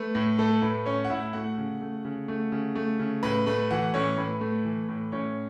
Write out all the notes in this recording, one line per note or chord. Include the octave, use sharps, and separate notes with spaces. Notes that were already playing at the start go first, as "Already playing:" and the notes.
Already playing: A3 B4
A2
A3 A4
A2 B4
A3 C#4 C#5
F#5
A2 E4 E5
A3 F#4 F#5
C#3
A3
C#3
A3
C#3
A3
C#3
A2 B4 B5
A3 B4 B5
E3 F#4 F#5
A2 C#4 C#5
A2 B4
A3
E3
A2
A2 C#4 C#5